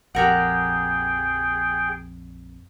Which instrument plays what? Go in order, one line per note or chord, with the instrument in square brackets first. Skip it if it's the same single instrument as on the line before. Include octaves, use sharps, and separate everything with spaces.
[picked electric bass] A#1 F2 [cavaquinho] G4 A#4 F#5 [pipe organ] G#4 G5